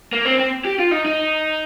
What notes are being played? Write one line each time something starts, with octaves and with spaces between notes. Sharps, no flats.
A#3
C4
C4
G4
F4
D#4
D#4